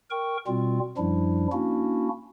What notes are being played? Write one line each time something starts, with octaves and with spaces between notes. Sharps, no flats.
A#4 G5 C#6
B2 G3 C4 F4
F#2 F3 G3 D4 E4
A#3 C#4 D4 E4 F#4